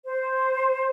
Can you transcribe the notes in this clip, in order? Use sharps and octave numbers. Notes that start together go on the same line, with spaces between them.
C5